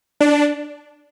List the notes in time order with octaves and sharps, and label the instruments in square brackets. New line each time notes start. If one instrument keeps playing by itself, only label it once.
[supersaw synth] D4